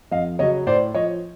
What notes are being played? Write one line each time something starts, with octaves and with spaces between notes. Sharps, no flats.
F2 D#5 F5
C#3 F#3 C#5 D#5
A2 C5 D5
F3 C#5 D#5